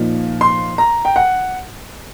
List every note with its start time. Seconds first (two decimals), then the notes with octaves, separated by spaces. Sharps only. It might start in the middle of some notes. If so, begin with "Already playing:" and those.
Already playing: A#2 F3 A#3 D#4
0.41 C6
0.78 A#5
1.05 G5
1.16 F#5